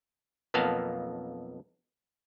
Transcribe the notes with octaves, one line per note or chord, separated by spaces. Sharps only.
B1 F2 A#3 B3 F5 A5